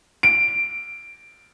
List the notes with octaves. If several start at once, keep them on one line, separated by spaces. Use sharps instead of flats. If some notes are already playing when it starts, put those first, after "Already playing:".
D7